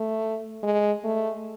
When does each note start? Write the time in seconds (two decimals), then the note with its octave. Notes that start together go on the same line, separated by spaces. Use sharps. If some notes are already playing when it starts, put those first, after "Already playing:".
Already playing: A3
0.63 G#3
1.04 A3